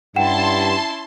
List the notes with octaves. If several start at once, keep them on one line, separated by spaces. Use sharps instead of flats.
G2 C#4 E4 F#5 G5 A5 C6 E7